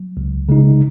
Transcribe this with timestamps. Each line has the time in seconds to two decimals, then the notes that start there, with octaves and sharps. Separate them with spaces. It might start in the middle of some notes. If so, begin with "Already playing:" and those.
Already playing: F#3
0.17 C#2
0.49 C#3 G#3 D#4